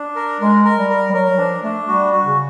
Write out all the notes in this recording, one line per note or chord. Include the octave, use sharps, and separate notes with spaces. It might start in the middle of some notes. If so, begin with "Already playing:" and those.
Already playing: D4
A#4
G#3 A#4
A#4
G3
A#4
G3
F#3 A#4
F#3
F3 D4
A3 D4
G3 F#4
F#4
C#3